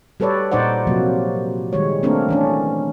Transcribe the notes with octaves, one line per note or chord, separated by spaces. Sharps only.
G3 A4 B4 C#5 D5
A#2 D#4 C5 D5 F#5
C3 F3 F#3 A#3
D#3 G3 G#3 C#5
A3 A#3 C4 D4 A#4
E3 C#4 D4